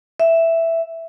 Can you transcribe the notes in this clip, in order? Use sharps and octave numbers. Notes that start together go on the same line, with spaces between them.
E5